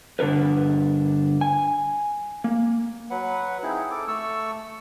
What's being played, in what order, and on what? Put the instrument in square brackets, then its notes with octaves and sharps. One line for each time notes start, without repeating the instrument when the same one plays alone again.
[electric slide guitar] G2 D3 D4 A#4 B4
G#5
A#3
[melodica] F#3 B4 F#5
C4 D#4 E4 G#4
A4 D6
A3 A4 C#6 E6